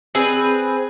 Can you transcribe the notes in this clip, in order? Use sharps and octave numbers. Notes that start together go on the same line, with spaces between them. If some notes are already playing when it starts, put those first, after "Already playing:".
C4 G#4 B4